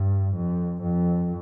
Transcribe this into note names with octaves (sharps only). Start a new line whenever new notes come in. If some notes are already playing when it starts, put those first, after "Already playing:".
Already playing: G2
F2
F2